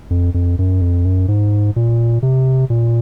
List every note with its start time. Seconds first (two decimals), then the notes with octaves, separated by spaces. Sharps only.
0.10 F2
0.34 F2
0.59 F#2
0.81 F2
1.05 F#2
1.28 G#2
1.76 A#2
2.23 C3
2.70 A#2